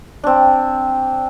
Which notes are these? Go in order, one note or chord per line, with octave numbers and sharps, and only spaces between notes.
C4 D4